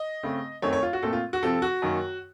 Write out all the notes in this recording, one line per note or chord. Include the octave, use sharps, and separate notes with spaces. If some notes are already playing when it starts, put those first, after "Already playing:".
Already playing: D#5
C#3 A3 C4
F#2 D#3 F#3 A3 C4 C#5
C#5
F4
F#4
A#2 A3 C4 A4
F4
F#4
C3 F3 C4 A4
F#4
F#2 D#3 A#3